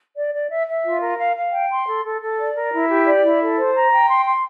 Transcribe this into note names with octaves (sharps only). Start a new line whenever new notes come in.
D5
D5
E5
E5
F4
A#4
F5
F5
G5
C6
A4
A4
A4
D5
A#4
E4
G4
D5
E4
A4
C5
A#5
G5
C6
C6